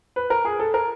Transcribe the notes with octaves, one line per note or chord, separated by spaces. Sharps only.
B4
A#4
G#4
A4
A#4